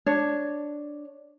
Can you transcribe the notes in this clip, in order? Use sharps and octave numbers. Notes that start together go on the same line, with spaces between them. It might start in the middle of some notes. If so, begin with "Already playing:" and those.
D4 C#5